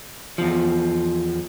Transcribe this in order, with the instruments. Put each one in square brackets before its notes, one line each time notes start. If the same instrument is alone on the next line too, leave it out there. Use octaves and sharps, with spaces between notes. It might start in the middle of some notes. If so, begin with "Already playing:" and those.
[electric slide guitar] E2 F3